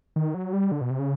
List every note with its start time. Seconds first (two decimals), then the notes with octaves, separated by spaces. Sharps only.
0.16 D#3
0.34 F#3
0.53 G3
0.72 D3
0.81 B2
0.90 C3
0.99 C#3